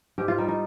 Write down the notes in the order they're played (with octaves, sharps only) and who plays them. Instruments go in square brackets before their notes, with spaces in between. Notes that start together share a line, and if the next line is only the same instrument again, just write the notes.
[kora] G#2 G4
F4
G3 D#4
D#4